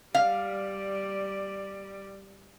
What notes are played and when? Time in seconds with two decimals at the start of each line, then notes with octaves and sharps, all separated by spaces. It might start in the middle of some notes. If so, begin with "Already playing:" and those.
0.14 G3 D5 F5